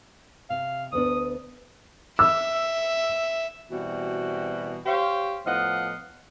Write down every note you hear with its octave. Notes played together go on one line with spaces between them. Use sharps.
C3 F5
D2 B3 D4 D#6
E5 E6
B2 E3 G3 C4 F#4
G4 C5 C#5 F5
A2 F3 B3 D#5 F5 F#5